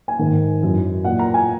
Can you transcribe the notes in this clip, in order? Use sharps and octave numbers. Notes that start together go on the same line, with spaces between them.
G#5
G#2 D#3
F#2 E3
A#2 F#5
A#5
G#5